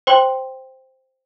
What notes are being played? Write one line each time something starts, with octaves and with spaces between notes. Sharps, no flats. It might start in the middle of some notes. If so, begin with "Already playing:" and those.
C5 G5 C6